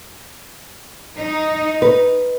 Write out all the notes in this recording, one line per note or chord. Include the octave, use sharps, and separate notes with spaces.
D#4
B4